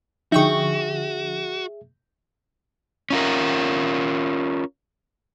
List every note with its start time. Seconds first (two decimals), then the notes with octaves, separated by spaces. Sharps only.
0.32 D3 F3 D#4 F#4 G#4 E5 G5 C#6
3.10 C#4 F4 A#4